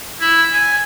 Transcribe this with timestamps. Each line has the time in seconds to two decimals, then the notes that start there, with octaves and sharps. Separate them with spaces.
0.21 E4
0.53 G#5